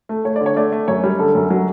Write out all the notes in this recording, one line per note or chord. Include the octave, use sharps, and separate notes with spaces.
A3
A3 C#5
D5
D3
C#5
A3 D5
A3
F#2 C#5
G3
D3 A4
F#2
F#3